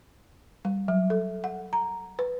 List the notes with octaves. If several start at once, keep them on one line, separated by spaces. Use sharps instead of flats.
G3
F#3
A4
F#5
A#5
B4